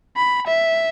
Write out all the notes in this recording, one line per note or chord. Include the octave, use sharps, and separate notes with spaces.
B5
E5